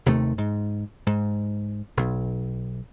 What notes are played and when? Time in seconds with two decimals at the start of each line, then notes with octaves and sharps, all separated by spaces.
0.06 D#2 C3 D#3 A3
0.38 G#2
1.07 G#2
1.97 B1